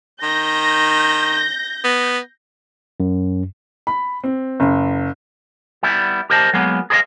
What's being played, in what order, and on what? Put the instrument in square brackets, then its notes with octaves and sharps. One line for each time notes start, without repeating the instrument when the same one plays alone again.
[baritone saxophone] D#3 [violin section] G6 A#6
[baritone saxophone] B3
[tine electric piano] F#2
[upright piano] B5
C4
F#1
[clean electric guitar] G3 B3 E4
G4 A#4 C5 D#5 G#5 A5
F#3 G#3 A#3 B3
G#4 A#4 C5 D5 D#5 F5